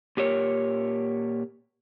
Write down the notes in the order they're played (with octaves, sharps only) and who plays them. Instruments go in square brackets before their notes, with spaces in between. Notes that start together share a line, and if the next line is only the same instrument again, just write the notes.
[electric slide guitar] A#2 G4 A#4 C#5